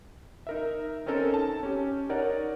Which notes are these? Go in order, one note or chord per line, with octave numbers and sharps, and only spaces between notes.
D#4 A#4 E5
C4 C#4 D#4 A4 A#4
A5
C#4 G4
D#4 A#4 C#5 D5 F#5